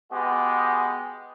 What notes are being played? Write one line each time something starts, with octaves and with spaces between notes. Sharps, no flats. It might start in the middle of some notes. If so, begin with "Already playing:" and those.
G#3 B3 F#4 G4